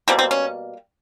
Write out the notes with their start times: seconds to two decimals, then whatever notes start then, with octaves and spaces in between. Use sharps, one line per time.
0.08 B2 G3 A#3 C4
0.19 C4
0.31 C#4